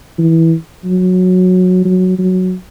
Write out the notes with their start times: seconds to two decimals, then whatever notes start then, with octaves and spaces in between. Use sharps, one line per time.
0.18 E3
0.85 F#3
1.85 F#3
2.18 F#3